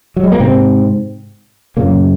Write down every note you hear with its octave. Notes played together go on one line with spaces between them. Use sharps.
F#3
G#3
A#3
G#2 C3 C4
F#2 A#2 C#3 A#3